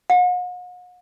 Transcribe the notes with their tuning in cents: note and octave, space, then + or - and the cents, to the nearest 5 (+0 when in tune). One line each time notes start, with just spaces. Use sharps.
F#5 -45